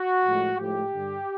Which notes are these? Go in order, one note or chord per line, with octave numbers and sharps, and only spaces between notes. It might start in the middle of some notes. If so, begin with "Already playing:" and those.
Already playing: F#4
A2 F3 G#3
A2 F3 G#3 G4
G2 D3 G3